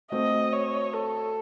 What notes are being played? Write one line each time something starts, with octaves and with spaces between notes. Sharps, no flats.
A3 C4 F#4 D#5
C#5
A4